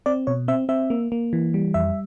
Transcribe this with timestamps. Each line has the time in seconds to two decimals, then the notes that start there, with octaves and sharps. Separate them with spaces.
0.06 C4 D5
0.27 B2 C#5
0.48 C4 E5
0.69 C4 E5
0.90 A#3
1.12 A#3
1.33 E3
1.54 G3
1.74 F2 E5